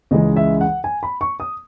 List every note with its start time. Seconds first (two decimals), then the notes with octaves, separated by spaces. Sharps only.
0.11 C#2 C#3 E3 G#3 D#5
0.36 E5
0.61 F#5
0.84 G#5
1.03 B5
1.21 C#6
1.40 D#6